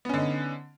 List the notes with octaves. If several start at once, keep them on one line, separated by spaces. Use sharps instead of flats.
D3 B3 C#4 D#4